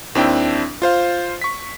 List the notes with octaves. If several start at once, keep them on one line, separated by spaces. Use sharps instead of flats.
D#2 C4 D4 E4 E5 G5
F4 C5 F5
C#6 B6